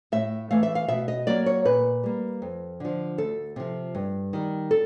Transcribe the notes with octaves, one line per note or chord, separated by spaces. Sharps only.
A2 E5
E3 A3 F5
E5
F5
B2 E5
D#5
F#3 A#3 D5
C#5
A#2 B4
G3 A#3
F2
D3 F3
D2 A4
C3 F3
G2
D#3 G3
A4